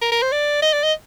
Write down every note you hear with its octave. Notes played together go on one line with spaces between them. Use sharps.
A#4
A#4
C5
D5
D#5
D5
D#5